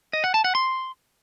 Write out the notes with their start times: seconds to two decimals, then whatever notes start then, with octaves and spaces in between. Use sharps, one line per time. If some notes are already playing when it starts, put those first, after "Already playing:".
0.13 D#5
0.24 F#5
0.34 A5
0.44 F#5
0.55 C6